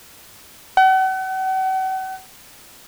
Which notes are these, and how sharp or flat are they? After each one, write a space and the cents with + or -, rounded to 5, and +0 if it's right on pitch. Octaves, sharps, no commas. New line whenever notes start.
F#5 +40